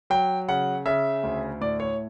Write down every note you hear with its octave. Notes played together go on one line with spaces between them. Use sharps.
F#3 G5
C#3 F#5
C#3 E5
D2
A2 D5
C#5